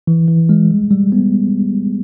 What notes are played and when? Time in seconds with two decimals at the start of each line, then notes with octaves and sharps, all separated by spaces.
0.07 E3
0.28 E3
0.49 G#3
0.71 G3
0.91 G3
1.12 B3